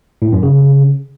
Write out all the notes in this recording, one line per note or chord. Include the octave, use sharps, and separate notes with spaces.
A2
F#2
C#3